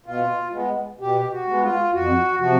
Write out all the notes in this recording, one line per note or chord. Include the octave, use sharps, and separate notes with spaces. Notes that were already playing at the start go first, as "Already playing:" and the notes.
B2 F4
G#3 B3
B2 G4
F#4
G#3 B3
F4
F2 F#4
C3 F3 F#4